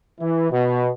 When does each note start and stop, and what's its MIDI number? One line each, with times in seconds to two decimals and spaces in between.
0.20 0.47 52
0.51 0.88 47